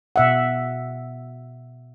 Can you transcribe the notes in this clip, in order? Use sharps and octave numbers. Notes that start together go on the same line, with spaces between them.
B2 E5 F#5